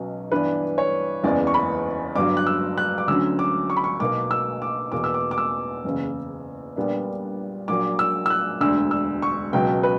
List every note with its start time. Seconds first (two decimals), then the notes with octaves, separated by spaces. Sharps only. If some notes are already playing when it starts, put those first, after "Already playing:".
Already playing: B1 B2 F#3 C#4
0.32 G2 E3 B3 D4 B4
0.78 C#5
1.23 F#1 E2 C#3 E3 B3 D5
1.47 C#6
1.54 B5
2.16 G1 G2 F#3 D6
2.37 F#6
2.47 E6
2.78 F#6
2.98 D6
3.07 D2 D3 F#3 C#4 E6
3.39 D6
3.70 C#6
3.77 B5
3.84 C#6
4.00 B1 B2 A#3 D6
4.31 E6
4.62 D6
4.92 E2 B2 A#3 D6
5.04 E6
5.14 D6
5.31 D6
5.38 E6
5.84 F#1 E2 C#3
6.76 A#1 A#2 G3 B3 D4
7.68 A#1 A#2 F#3 A#3 D6
7.99 E6
8.26 E6
8.30 F#6
8.61 E1 D2 D3 E6
8.91 E6
9.22 C#6
9.53 C#2 B2 F#3 G5
9.83 B4